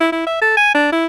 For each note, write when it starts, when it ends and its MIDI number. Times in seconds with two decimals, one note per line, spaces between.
0.01 0.10 64
0.12 0.23 64
0.27 0.39 76
0.42 0.56 69
0.57 0.72 80
0.75 0.92 62
0.93 1.06 64